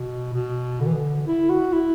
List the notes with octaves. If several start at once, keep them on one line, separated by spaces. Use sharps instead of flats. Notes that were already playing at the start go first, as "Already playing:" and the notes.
Already playing: B2
B2
D3
E3
D3
E4
F#4
E4